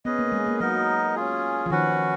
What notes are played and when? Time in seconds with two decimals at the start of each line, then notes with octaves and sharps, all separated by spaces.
0.05 B3 C#4 G#4 B4 D#5
0.19 A#3
0.32 G#3
0.47 A#3
0.60 F#3 B3 D#4 A#4 D#5
1.15 C#4 F4 G#4
1.66 F3
1.70 D#3 C#4 F#4 B4 F#5